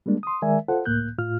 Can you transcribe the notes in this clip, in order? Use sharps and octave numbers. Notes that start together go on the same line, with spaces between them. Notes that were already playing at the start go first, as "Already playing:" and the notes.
G3 G#3 A#3 D4
C6 D#6
D#3 G#3 A#4 D5 E5 G#5
F4 A4 C5 F#5
C#2 A2 A#3 F#6 G6
A2 F4 F6